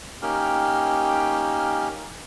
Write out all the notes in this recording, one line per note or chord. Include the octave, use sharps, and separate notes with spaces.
A#3 C#4 D#4 G4 G5 F6